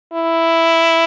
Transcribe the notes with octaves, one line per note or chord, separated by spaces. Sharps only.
E4